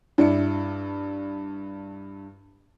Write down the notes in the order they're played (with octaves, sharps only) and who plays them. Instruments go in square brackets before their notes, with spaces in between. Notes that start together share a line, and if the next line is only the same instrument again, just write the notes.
[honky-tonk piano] G2 D4 E4 C#7